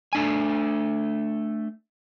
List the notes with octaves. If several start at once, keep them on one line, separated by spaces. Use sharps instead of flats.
A3 D4 G#5